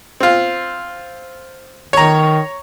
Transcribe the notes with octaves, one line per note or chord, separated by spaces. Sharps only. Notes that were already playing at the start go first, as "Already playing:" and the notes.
C4 F4
D#3 C#5 A#5